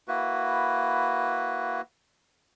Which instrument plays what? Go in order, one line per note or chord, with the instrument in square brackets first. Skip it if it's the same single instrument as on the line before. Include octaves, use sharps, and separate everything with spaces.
[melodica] A#3 E4 F#4 B4